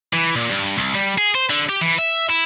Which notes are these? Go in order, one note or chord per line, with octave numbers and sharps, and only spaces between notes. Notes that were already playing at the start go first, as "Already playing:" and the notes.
E3
A#2
G2
C2
G3
G#4
C5
D3
G4
E3
E5
E4